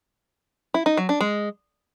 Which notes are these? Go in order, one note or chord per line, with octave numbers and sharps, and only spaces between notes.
E4
D#4
F#3
D4
G#3